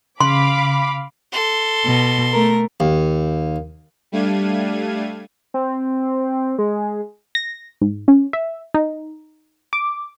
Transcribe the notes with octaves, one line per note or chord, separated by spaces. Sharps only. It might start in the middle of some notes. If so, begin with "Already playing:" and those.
C#3 F5 B5 C6 D6
A4 C6
B2
A3 A#4
D#2
G3 A3 D4 F5 G#6 D#7
C4
G#3
A#6
G#2
C#4
E5
D#4
D6